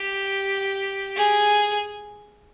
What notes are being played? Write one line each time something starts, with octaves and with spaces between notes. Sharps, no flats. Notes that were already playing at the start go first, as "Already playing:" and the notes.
Already playing: G4
G#4